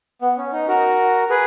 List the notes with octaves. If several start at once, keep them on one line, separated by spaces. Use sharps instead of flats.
B3
C#4
D#4
F#4 A#4
G#4 B4